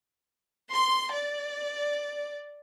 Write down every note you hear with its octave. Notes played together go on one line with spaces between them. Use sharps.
C6
D5